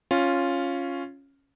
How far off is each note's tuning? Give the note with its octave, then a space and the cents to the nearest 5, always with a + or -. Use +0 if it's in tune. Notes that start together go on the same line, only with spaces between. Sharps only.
C#4 -5 F4 +0